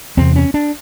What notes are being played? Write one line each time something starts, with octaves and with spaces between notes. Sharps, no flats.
E2 C3 C4
C#4
D4